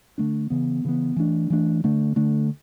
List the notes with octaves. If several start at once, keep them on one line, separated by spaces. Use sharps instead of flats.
D3 A3 D4
C#3 E3 B3
C#3 E3 B3
E3 A3 D4
E3 A3 D4
D3 A3 D4
D3 A3 D4